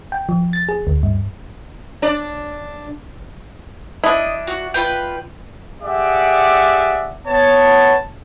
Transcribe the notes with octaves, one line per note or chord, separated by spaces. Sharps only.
G5
F3
A6
G#4
D2
G2
D4 D5
D4 E4 D#5
F#4
F4 B4 G5
G4 G#4 D5 E5 F#5 D6
B3 C#5 A5